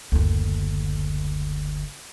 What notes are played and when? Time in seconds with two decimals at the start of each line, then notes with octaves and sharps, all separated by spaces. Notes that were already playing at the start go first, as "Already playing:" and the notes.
0.12 F#1 D2